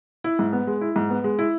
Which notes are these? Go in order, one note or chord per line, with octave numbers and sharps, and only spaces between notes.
E4
G#2
B3
G#3
E4
G#2
B3
G#3
E4